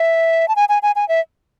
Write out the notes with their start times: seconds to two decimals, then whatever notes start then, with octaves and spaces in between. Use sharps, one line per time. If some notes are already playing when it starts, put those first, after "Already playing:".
Already playing: E5
0.48 A5
0.56 G#5
0.69 G#5
0.83 G#5
0.96 G#5
1.08 E5